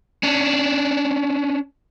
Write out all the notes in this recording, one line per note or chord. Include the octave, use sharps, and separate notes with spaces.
C#4 D4